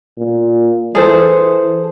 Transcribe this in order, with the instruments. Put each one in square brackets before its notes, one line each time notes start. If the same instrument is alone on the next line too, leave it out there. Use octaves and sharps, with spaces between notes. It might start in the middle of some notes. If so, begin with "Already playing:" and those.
[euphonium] A#2
[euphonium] E3 [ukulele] G#4 A4 C5